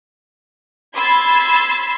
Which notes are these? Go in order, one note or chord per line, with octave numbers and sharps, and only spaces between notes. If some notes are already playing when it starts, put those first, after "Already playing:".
B5 C6 E6 G#6 A6 C7